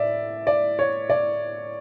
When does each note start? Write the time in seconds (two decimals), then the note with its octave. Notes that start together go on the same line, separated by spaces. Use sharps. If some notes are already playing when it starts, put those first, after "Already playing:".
Already playing: A2 D5 E5
0.47 D5
0.79 C#5
1.10 D5